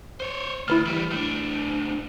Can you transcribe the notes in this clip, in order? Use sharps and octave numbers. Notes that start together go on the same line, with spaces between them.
C5 C#5
D2 E4 B4 F6
E3 G3
A2 D4